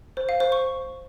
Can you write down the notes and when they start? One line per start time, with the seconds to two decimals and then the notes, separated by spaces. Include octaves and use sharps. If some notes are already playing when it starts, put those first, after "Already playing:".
0.17 C5
0.29 F5
0.40 C5
0.52 C#6